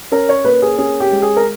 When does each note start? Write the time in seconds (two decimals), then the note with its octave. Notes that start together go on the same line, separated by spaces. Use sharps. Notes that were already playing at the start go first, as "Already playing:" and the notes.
0.12 C#4 A#4
0.29 C#5
0.45 A#3 B4
0.62 G#4
0.78 C#4 G#4
1.00 G4
1.11 G#3
1.22 G#4
1.37 A#4